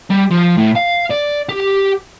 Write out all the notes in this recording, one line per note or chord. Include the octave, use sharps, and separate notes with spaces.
G3
F3
A2
F5
D5
G4